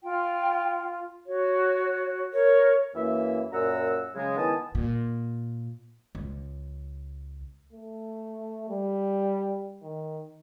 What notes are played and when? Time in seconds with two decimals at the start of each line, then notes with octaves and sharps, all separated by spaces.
0.03 F4 G5
1.26 F#4 C#5
2.33 A#4 C#5
2.95 F#2 E3 A#3 E5
3.53 F#2 A#2 F#5 A#5 E6
4.15 C#3 F#3 G#3
4.36 D#3 B3 E4 G#5 A5 D#6
4.75 A#2
6.15 C#2
7.73 A3
8.70 G3
9.83 D#3